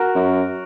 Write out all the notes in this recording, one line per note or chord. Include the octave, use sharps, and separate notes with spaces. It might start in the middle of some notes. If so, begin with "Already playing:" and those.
Already playing: F#4 A#4
F#2